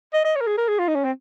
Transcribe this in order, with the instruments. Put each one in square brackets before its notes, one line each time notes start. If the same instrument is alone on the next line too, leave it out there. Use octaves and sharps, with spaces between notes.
[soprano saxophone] D#5
D#5
C#5
A#4
G#4
A#4
G#4
F4
D#4
C#4
C4